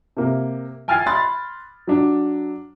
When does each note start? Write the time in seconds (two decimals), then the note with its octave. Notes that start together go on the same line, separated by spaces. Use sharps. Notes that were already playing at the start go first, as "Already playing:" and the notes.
0.17 C3 A#3
0.88 G5 G#5 F6 G#6 A6 C7
1.06 B5 C6 F#6 A6
1.87 F#3 D4